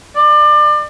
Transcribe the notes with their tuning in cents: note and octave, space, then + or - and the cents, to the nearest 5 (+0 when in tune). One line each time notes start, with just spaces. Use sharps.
D5 +30